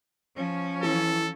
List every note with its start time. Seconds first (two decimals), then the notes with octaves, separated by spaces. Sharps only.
0.36 F3 C#4
0.83 E3 A4